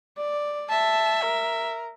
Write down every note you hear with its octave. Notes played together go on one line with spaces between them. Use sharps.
D5
E5 A5
A#4